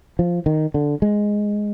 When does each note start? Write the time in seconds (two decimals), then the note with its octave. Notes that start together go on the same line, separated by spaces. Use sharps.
0.19 F3
0.46 D#3
0.74 D3
1.02 G#3